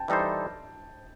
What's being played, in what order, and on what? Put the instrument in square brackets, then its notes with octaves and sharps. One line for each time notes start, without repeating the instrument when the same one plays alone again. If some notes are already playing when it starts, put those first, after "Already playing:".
Already playing: [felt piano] G5 A5
[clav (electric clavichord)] E3 G3 D#4 A4 C5
[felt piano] A5